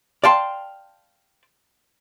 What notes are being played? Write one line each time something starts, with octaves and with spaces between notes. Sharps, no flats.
D5 F5 G5 A5 C6